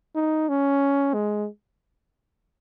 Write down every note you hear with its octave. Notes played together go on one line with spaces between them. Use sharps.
D#4
C#4
G#3